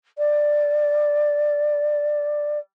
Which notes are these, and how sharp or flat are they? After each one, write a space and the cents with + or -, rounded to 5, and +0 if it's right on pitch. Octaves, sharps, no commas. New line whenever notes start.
D5 +5